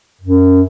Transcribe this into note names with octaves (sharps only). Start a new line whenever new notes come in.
F#2